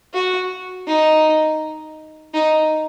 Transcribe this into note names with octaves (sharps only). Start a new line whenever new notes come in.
F#4
D#4
D#4